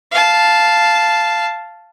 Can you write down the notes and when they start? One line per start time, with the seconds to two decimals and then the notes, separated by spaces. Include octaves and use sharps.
0.12 F5 A5